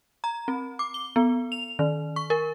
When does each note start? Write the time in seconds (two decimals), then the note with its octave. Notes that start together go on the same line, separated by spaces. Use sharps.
0.24 A#5
0.48 C4
0.79 D6
0.94 G7
1.16 B3
1.52 F7
1.79 D#3
2.16 C#6
2.30 A#4